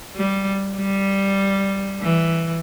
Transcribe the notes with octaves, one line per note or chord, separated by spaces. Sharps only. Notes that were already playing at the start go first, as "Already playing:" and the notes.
G3
G3
E3